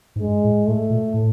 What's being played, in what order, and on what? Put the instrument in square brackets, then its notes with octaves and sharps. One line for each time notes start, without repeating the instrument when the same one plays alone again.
[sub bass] G#2
[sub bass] G2 [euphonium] G#3
[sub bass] A2
[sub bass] A2 [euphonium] A3
[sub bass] A#2
A2